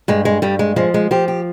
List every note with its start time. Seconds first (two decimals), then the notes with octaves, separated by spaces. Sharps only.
0.08 G2 G#3
0.25 G#3
0.42 G2 G3
0.59 G#3
0.76 F3 G#3
0.94 G#3
1.11 F3 G4
1.28 G4